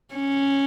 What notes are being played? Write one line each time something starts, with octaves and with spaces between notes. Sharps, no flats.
C#4